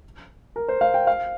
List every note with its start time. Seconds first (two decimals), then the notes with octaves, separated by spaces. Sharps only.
0.56 A#4
0.68 C5
0.81 F5
0.94 G5
1.07 F5